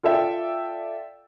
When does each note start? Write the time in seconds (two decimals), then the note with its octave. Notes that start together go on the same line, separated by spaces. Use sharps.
0.03 F4 A4 D5 E5 G5